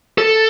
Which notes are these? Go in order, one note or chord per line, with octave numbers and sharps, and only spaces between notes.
A4